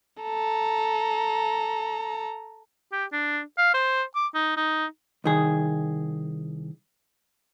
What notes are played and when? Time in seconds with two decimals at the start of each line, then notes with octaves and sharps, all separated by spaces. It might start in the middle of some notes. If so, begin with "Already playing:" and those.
0.23 A4 A#5
2.92 G4
3.12 D4
3.58 F5
3.74 C5
4.15 D6
4.34 D#4
4.57 D#4
5.24 C2 D#3 G#4